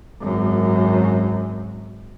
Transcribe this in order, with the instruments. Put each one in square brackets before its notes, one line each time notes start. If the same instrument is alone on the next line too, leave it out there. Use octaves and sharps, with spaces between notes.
[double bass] G#1 F#2